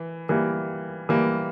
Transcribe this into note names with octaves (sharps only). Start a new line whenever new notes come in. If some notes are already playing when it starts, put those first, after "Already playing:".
Already playing: E3
E3 G3 A#3
E3 G3 A#3